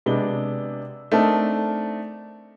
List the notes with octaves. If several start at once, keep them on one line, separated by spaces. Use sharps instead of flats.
C3 G#3 B3 D4 G7
A3 C4 D4 D#4 A#4 A5